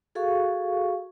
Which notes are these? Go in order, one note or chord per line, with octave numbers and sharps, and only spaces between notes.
F#4 G#4 A4 F5 C#6